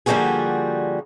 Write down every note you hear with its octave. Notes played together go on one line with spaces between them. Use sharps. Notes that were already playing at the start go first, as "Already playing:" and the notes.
D3 F3 G3 A#3 F#4 G#4